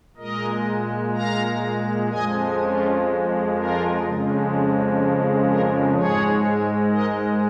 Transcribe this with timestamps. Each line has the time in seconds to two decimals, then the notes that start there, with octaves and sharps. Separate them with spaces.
0.17 A#2 G#3 A#4 D#5
1.14 F5 A#5
2.10 F2 F3 G#3 D#5 G#5
2.58 C#4 F4
3.54 F4 A#4
4.02 F2 C#3 F3 G#3
5.47 F4 A#4
5.94 G#2 G#3 G#4 C#5
6.91 A#4 D#5